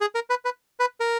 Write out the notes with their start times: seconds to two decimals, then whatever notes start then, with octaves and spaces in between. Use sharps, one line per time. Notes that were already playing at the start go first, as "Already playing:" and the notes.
0.01 G#4
0.15 A#4
0.30 B4
0.45 B4
0.80 B4
1.00 A#4